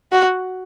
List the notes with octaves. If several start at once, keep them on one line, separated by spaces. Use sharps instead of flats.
F#4